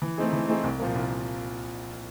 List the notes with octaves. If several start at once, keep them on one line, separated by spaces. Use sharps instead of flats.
E3
A3 C4 D#4 G#4
E3
A3 C4 D#4 G#4
C2
A#2 F3 A#3
C2